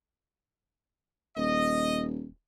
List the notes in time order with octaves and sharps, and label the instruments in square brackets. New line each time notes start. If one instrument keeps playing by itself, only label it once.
[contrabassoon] D#1 [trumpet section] D#5